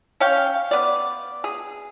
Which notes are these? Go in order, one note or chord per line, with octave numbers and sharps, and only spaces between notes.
C#4 C#5 F5 G5
B3 D5
G#4